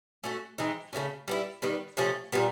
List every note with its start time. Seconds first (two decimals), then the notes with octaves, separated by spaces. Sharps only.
0.24 A3 C#4 F#4 A4
0.58 E3 G#3 C4 D#4
0.93 C#3 F#3 A3 C#4
1.28 G3 B3 E4
1.62 D#3 G3 B3
1.97 C3 F3 A3 C#4
2.32 A#2 G3 B3